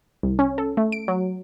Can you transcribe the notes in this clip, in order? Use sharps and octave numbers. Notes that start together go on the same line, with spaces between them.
C2
C#4
A4
A3
D7
F#3